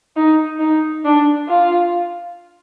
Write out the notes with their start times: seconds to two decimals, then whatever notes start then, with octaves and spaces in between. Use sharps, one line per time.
0.16 D#4
0.60 D#4
1.05 D4
1.49 F4